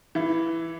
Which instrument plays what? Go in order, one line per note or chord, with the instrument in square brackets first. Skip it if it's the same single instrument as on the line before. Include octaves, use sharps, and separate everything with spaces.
[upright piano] E3 E4